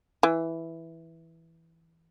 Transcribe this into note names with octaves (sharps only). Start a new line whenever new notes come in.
E3